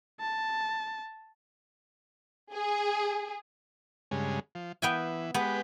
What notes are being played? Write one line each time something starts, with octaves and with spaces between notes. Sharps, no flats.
A5
G#4
G2 C#3 G#3
F3
E3 B3 G5 G#5
G#3 B3 G4 B4